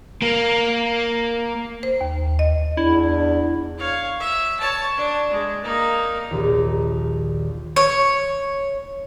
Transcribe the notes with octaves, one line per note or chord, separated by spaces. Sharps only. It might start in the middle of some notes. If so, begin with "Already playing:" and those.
A#3 A#4
C5
D#2
D#5
E2 D4 E4
C#5 F5
E5
C#5 A5
D4
G#3
A#3 D#4
A#1 D#2
C#5